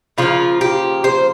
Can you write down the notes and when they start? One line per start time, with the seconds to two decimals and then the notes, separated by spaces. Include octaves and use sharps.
0.18 C#3 F3 A#3 F4
0.61 G4
1.04 C5